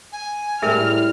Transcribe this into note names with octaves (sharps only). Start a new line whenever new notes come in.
G#5
A2 G3 G#4 A#4 E5 F6